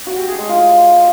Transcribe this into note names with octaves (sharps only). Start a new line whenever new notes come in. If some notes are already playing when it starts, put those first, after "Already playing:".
F#4
G4
G#4
G#3
F4